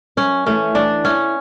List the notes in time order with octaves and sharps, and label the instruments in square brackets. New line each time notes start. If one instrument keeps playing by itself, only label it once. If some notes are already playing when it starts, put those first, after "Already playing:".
[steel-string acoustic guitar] F#2 [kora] C#4
[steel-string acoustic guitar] E3 A3 [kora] C#4
[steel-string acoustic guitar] E3 [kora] D4
[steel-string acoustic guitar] B3 E4 [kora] C#4